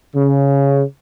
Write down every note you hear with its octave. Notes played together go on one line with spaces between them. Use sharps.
C#3